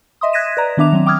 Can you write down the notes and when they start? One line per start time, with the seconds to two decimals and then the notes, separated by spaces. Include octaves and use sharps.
0.21 D#5 E5 C6 D#6
0.33 F#6 G#6 A#6 B6 D#7 E7
0.57 B4 D5 A#5
0.77 D#3 B3 D4 E5 D6 F7
0.92 F#3 C4
1.06 G5 D6 D#6 F6 G#6